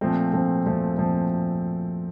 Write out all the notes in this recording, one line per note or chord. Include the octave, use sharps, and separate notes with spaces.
A#2 F3 A3 C4
A#2 F3 A3 C4
A#2 F3 A3 C4
A#2 F3 A3 C4